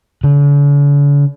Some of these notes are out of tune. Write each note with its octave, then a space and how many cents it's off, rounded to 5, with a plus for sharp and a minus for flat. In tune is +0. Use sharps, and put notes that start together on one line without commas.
D3 -45